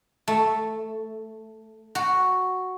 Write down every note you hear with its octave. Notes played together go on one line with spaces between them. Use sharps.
A3
F#4